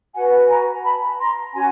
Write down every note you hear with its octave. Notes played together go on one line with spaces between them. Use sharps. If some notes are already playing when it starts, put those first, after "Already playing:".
F#4 B4 F#5 G#5
G#5 A#5
A5 B5
A#5 C6
C#4 F#4 G#5 A#5